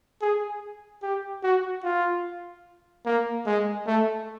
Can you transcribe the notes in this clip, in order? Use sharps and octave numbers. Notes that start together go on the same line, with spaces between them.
G#4
G4
F#4
F4
A#3
G#3
A3